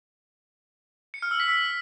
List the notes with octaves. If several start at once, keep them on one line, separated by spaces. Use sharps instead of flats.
C#7
F6
E6
B6
E6